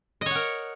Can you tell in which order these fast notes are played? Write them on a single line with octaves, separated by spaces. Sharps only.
D#5 C#5 F#5 A#4